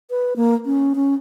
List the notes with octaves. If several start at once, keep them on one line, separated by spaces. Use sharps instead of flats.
B4
A#3
C#4
C#4